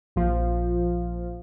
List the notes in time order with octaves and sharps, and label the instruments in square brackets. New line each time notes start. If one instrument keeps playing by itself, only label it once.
[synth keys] A#1 F3